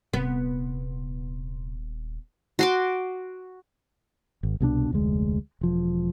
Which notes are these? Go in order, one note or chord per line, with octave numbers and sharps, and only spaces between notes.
D#1 C3 B3
F#4 C6 D6
G#1
C2 B2 E3 D4
F1 D2 G#3
E1 F3